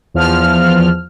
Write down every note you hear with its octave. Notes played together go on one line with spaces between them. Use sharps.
E2 F3 F6